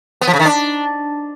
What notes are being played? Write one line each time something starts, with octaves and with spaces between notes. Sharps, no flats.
B3
F3
C#3
D#3
D4